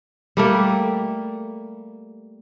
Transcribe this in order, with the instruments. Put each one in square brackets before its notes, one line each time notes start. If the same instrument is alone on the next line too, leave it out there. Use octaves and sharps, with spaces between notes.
[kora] G3 A3 A#3